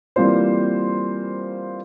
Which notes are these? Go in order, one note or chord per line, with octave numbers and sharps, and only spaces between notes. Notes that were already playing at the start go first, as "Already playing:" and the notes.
E3 G3 A#3 C4 F4 C5